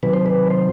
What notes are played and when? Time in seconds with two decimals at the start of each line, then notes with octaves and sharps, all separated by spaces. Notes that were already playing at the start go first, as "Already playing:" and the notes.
0.03 C3 D#3 F#3 B4
0.14 C5
0.26 B4
0.50 C5